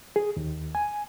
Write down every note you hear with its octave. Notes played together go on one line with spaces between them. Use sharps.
G#4
D#2
G#5